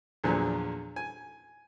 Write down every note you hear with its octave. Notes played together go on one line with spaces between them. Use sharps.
E2 A#2 D3 F3 F#3
G#5